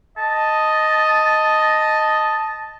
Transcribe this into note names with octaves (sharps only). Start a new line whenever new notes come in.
D#5 A5